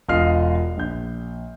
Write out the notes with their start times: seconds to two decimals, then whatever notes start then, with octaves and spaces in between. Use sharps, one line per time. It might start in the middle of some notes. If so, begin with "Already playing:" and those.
0.09 E1 F4 D#5 F6 C7
0.77 A#1 G6